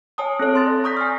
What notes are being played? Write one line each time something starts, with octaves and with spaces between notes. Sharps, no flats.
C#5 G#5 A5 D#6
C4 A4 C#5
A4 C6 A6
D5
A#5 C#6 D#6 G6 A#6 B6
G#5 F6